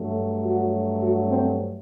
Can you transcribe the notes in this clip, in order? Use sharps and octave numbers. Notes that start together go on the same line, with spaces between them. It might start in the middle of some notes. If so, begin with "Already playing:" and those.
Already playing: G2 F#3 A3
F#4
F#4
C4